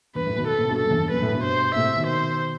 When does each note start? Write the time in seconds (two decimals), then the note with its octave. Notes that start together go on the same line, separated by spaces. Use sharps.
0.15 E2 G2 B4
0.26 F#2 A2
0.36 B2 D#3
0.48 A4
0.58 A2 C3
0.69 G2 B2
0.79 A4
0.85 F#2
0.90 E2 G2
1.01 E2
1.11 F#2 B4
1.22 F#2 A2
1.33 G2 B2
1.44 C5
1.75 A2 C3 E5
1.96 B2 D#3
2.07 C5